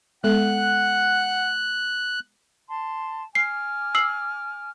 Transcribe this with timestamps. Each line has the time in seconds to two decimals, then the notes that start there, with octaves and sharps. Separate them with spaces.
0.24 G#3 B3 A4 F#5 F#6
2.68 A5 C6
3.35 G#5 D6 F6 C7
3.95 E6 C7 F#7